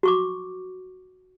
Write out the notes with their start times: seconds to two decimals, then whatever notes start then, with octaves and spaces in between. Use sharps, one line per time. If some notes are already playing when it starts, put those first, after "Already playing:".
0.03 F#4 C#6 D6